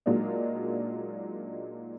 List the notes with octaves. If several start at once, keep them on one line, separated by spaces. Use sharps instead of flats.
A#2 F#3 G#3 A#3 D4 D#4